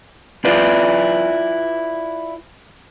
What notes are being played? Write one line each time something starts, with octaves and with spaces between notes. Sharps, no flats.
E4 F4 B4 D5